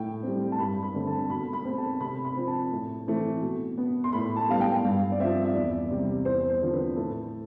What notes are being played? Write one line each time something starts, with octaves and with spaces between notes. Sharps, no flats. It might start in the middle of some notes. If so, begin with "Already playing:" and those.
Already playing: A2 G5
G3 C4
A5
G2 B5
B5
D3 A3 C4
A5
B2 B5
B5
A3 C4
A5
C3 B5
B5
F3 C4
A5
A2
E3 A3 C4
B2
B3
C6
A2 B5
A5
G3 B3 F5
G5
G2 F5
D5
F3 C4 E5
E5
E2 D5
C3 G3
E2 C5
C5
D3 F3 C4
B4
A2 A4